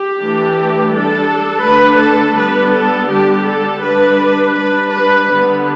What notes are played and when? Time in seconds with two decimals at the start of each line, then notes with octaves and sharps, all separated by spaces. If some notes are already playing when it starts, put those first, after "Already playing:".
Already playing: G4
0.18 E3 A3 D4
0.91 G3 D4 A4
1.64 D3 A3 D4 B4
2.00 A4
2.37 G3 B3 D4 B4
2.74 A4
3.10 D3 G3 D4 G4
3.47 A4
3.83 G3 D4 B4
4.56 G3 D4 B4
4.93 B4
5.29 D3 G3 B3